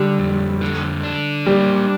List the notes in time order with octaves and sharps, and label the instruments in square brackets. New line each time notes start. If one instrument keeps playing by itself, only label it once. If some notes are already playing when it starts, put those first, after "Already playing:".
Already playing: [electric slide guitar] D3 [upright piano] G3
[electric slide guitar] F2
D3
D4
[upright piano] G3 [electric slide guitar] A#3